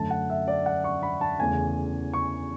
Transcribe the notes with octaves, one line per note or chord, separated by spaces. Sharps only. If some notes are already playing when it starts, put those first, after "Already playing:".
Already playing: F#2 D3 A3 A5
F#5
E5
D5
F#5
C#6
B5
A5
E2 C#3 E3 A3 G#5
C#6